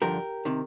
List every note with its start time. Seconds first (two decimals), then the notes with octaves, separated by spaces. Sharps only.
0.02 G2 D3 F3 G4 A#4
0.45 C3 D#3